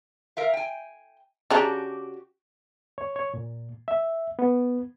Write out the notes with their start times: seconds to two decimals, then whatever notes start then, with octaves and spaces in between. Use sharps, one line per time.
0.37 A#4 E5 F5
0.53 G5 G#5
1.50 C#3 D4 F#4 G4 A#5
2.98 C#5
3.16 C#5
3.34 A#2
3.88 E5
4.39 B3